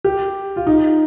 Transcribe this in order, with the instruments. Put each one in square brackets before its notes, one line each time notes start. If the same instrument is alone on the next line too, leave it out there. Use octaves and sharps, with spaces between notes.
[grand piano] G4
F4
D#4